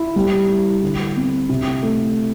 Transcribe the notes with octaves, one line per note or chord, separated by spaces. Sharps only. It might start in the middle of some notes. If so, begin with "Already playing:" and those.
Already playing: E4
G3
E4
D3
C4
C3
A3